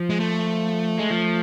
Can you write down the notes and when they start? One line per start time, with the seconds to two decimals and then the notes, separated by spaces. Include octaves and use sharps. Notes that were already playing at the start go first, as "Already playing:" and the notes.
Already playing: F3
0.10 G#3
0.20 A3
0.99 G#3
1.10 F3